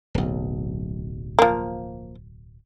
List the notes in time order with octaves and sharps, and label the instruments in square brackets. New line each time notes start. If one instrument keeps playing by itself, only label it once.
[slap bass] D1 B1
[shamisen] F3 A#3